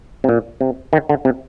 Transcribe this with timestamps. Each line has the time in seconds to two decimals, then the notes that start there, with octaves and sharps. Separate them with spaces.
0.24 C3
0.29 A#2
0.61 C3
0.93 D#3
1.09 D3
1.25 C3